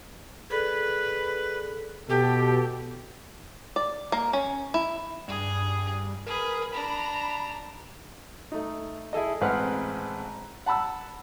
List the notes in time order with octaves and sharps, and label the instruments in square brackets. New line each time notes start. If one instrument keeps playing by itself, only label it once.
[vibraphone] G#4 A4 D5 [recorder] B4
[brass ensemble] B2 A4 [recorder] G4 [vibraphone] A5
[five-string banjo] D5
A#3
C#4
E4
[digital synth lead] G2 [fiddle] G#4
[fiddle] G#4 B4 [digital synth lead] A#4
[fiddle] D4 A#5 [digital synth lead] B5
[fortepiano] A3 D#4
E4 G#4 A4 D#5
A1 G#3 C4 B4 F#5 F6
F#5 A5 B5 E6